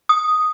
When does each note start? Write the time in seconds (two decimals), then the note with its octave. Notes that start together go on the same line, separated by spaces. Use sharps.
0.09 D#6